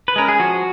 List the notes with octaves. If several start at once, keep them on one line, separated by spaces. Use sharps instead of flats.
B4
G#3 C#4 A#4
G#4
F3 F#4